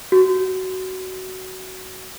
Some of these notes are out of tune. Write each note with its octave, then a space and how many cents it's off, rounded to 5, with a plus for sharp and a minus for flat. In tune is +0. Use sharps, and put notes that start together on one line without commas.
F#4 +15